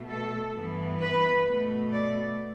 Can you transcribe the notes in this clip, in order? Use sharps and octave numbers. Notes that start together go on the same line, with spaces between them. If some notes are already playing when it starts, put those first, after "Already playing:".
Already playing: B2 A3
A4
G2 E3 B3
B4
B2 A3
D5